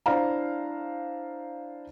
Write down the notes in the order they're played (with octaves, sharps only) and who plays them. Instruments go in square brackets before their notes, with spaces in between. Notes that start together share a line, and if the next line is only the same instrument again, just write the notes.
[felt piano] D4 E4 C5 F5 A#5